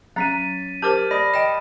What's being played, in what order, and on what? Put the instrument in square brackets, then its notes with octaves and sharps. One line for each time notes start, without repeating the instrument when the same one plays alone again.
[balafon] F#3 [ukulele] C#4 A#5 [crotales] A6 B6 D#7
[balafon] G4 A#4 C5 [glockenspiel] A5 D6 F6 [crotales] G6
[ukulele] D5 [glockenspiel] B5 D#6 [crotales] A#6
[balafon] D#5 G5 [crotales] A#6 D7 [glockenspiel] E7